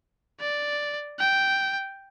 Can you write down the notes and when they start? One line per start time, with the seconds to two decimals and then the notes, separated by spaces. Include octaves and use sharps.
0.40 D5
1.20 G5